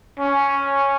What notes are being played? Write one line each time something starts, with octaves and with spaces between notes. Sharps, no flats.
C#4